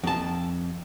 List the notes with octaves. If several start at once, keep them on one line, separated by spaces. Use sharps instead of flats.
F2 A5